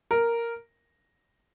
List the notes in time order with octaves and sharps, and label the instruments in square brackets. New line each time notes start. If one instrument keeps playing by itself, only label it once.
[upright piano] A#4